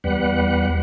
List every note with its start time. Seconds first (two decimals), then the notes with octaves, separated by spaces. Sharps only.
0.04 E2 G3 B4 F#5